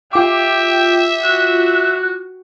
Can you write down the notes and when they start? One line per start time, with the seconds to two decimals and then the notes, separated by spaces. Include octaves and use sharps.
0.13 F4 G4 E5 D6
1.23 F#4 F#6